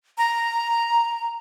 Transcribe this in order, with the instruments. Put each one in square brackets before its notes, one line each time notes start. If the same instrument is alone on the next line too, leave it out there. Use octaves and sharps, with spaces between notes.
[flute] A#5